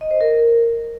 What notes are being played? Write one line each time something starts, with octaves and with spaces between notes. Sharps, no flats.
D#5
C5
A#4